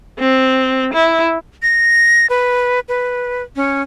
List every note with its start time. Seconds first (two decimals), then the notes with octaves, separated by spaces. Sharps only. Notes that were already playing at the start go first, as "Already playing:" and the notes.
0.19 C4
0.94 E4
1.62 A#6
2.30 B4
2.89 B4
3.56 C#4